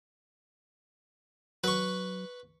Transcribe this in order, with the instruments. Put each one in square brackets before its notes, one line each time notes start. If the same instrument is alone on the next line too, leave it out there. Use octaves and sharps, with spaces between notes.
[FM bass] F#3 [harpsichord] B4 C#6